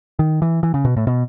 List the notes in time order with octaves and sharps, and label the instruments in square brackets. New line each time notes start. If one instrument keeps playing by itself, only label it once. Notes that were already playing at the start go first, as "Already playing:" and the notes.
[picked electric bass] D#3
E3
E3
C#3
B2
A2
B2